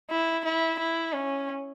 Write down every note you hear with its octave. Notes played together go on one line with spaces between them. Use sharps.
E4
E4
E4
C#4